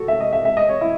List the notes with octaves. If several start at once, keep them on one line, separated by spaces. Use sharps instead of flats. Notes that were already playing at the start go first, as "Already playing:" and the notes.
Already playing: F#4 A4
E5
D#5
E5
E5
D#5
C#5
E4